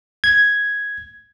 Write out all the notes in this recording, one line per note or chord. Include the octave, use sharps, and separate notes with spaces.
G#6